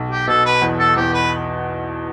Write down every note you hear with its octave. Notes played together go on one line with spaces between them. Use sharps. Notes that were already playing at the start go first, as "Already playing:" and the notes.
Already playing: B1
G4
B2 A4
B4
E2
A4
E2 G4
B4